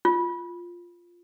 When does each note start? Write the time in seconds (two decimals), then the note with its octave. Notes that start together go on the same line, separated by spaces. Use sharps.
0.05 F4